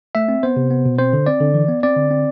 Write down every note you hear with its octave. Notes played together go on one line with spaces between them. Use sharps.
A3 E5
C4
B3 C5
C3
B3
B2
C4 C5
D3
C4 D5
D3
E3
B3
C4 D5
D3
C4